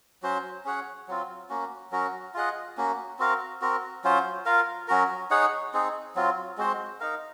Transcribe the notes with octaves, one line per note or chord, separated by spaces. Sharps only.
F#3 C#4 F#4 C5
C#4 G#4 C#5 F#5
F#3 C4 F4
A#3 C#4 F#4
F#3 C#4 F#4 A#4
F4 G#4 D#5 F#5
A#3 C#4 F#4
C4 F#4 A#4 F5
C4 F#4 A#4
F#3 C#4 F4 C5
F4 A#4 F5
F#3 C#4 F#4 A#4
D#4 G#4 C#5 F#5
C4 D#4 G#4
F#3 C4 F4
G#3 C4 F#4 C5
D#4 A#4 F5